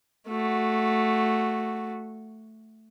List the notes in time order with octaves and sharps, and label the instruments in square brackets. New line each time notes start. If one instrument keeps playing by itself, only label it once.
[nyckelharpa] A3 F#4